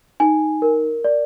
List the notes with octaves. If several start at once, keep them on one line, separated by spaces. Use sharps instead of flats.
D#4 G#5
A#4
D5